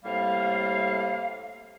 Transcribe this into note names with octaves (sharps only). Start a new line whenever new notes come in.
A2 C3 G3 A#3 F5